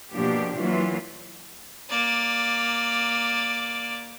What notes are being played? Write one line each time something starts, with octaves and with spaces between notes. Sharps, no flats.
B2 F3 A#3 D4 G4
E3 F#3 A#3 F4
A#3 D5